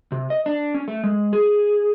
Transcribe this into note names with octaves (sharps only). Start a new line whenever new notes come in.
C3
D#5
D4
C#4
A3
G#3
G#4